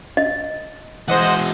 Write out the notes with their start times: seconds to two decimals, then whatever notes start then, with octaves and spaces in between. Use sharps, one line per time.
0.17 D#5
1.08 E3 G#3 C5 D#5 F#5